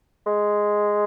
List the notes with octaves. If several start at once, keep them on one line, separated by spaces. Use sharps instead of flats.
G#3